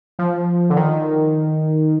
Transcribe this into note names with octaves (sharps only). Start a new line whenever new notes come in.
F3
D3
D#3